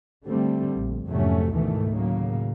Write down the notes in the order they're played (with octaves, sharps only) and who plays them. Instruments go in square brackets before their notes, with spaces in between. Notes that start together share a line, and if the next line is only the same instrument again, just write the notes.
[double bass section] D3 G3 A3 C4
A#1
F2 G#2 C3 F#3 A3 C#4
D2 G#2 B2 D#3 E3 A3
A2 C#3 F#3 A#3